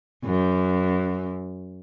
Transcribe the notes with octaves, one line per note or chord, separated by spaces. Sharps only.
F#2